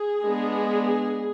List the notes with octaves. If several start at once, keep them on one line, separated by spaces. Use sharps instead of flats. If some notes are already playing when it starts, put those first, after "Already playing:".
Already playing: G#4
G#3 B3 D4